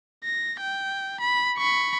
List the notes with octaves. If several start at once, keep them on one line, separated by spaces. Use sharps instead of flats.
A#6
G5
B5
B5 C#6